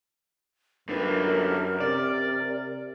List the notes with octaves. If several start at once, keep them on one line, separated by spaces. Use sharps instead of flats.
F#2 D3 A#4 B4
C3 D5